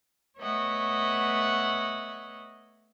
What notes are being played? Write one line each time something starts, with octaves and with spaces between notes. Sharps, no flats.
A3 B3 C#5 D#5 E5 F#5